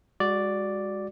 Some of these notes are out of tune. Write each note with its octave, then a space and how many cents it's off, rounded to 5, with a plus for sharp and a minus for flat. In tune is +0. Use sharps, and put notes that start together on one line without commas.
G#3 -30 F#4 +0 D5 +0